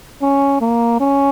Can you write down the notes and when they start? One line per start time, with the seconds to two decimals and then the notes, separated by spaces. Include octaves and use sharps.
0.22 C#4
0.61 A#3
1.00 C#4